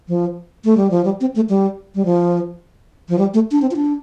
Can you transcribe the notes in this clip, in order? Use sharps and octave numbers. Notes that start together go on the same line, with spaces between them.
F3
A3
G3
F3
G3
C4
A3
G3
G3
F3
F3
G3
A3
D4
C4
F4
D4